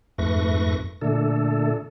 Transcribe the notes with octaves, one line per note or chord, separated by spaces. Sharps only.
F2 G#2 A3 B4 C#6 A#6
A#2 D3 A3 D4 A4